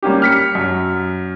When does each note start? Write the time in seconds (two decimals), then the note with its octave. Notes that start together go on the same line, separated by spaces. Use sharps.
0.03 G3 A#3 C#4 G4
0.22 F6 B6 C#7
0.55 F#2